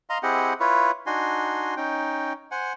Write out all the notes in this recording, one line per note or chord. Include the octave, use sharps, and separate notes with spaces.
D#5 F5 A#5 C6
C4 E4 G4 G#4 D#5 F#5
E4 F4 B4 C#5
D4 D#4 F#4 G#5 C6
C#4 D#4 G5
C5 F#5 G#5